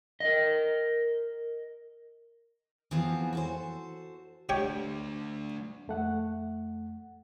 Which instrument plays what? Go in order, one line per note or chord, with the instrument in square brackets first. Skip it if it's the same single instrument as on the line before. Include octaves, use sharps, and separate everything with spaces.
[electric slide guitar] A#4 D#5
[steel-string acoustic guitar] E3 F3 B3 C4 F#4 G#4
F#4 A4 C5
[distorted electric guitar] A3 D4 [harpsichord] G4 C#5 G5
[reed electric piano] F2 A3 F#5